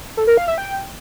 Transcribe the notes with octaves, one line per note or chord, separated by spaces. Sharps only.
A4
A#4
F5
E5
G5